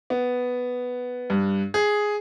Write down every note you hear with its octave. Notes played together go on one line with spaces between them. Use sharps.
B3
G2
G#4